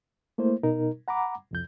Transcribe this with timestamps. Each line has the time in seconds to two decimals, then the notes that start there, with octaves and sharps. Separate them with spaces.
0.38 A3 A#3 E4 C5
0.63 B2 D#4 A#4
1.08 F#5 A#5 B5 D6
1.51 C2 F2 G6